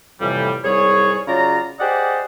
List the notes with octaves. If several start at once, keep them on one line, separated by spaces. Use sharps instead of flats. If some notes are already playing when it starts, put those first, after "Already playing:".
F2 A2 C3 E3 G3
C2 G#2 G3 G#4 C#5
C#3 F#3 F4 D5 A#5
G4 G#4 C5 D5 D#5 F#5